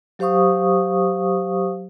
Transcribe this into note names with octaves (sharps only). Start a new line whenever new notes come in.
F#3 G4 C5 F5 C#6 D#6